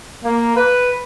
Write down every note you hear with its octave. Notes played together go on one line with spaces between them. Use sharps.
A#3
B4